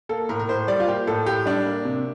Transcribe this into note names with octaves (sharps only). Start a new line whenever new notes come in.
A#3 A4
A2 A#4
A#4
A2 C5
G3 D5
F4
A#3 G4
A2 A4
A2 G4
G3 D4
A#3
C3